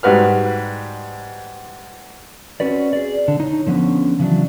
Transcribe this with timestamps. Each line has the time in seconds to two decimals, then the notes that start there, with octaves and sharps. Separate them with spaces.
0.03 G#2 G3 F#4 B4 F6
2.60 C4 C#4 F#4 B4 D5
2.93 G#4 D5
3.28 D3
3.40 D#4 C#5
3.67 D3 F3 B3 C#4
4.19 C#3 E3 F#3 D4